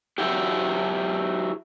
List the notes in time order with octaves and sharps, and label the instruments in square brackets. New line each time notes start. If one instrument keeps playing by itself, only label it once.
[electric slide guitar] F#3 E4 F#4 G4